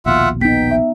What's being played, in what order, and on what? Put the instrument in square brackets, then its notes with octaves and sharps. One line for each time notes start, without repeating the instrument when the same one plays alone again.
[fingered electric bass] A#1 D#2 B2 [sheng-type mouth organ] F4 E5 F#5
[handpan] B3 D#4 [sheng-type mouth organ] G5 [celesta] B6
[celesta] E5